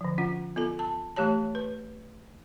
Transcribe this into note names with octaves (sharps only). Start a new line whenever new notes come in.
D3 F3
C#4 F4 F#5
B3 F4 A4
A5
E3 A3 G4 C#5 A5
B4